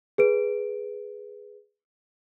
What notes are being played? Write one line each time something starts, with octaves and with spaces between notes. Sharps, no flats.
G#4 B4 D7